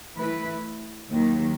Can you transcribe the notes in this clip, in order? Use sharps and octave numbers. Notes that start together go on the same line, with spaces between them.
E3 A3 E4 B4
D#2 D#3 F#3